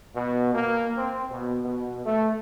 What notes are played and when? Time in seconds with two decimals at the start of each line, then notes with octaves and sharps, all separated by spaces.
0.16 B2
0.55 A#3
0.97 C4
1.31 B2
1.64 B2
2.06 A3